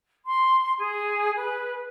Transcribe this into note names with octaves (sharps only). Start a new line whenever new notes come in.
C6
G#4
B4